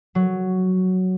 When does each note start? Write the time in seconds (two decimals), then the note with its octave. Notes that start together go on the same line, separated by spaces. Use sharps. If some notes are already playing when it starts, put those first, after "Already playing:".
0.15 F#3